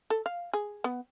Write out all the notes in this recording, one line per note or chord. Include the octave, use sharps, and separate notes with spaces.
A4
F5
G#4
B3